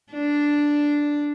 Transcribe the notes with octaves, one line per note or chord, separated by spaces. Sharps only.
D4